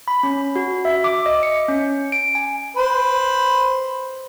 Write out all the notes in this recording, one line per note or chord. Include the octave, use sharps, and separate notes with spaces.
B5
C#4
F#4
E5
D6
D#5
C#7
C#4
D7
G#5
B4 C5 B5